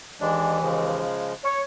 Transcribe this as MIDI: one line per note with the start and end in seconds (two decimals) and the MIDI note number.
0.21 1.05 39
0.21 1.05 52
0.21 0.59 56
0.21 0.59 62
0.62 1.33 49
0.62 1.33 53
0.62 1.33 56
1.43 1.61 73